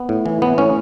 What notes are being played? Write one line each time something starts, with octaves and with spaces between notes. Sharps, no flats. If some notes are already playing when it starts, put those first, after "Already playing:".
Already playing: B3
A2
E3
E3 B3
A2 C#4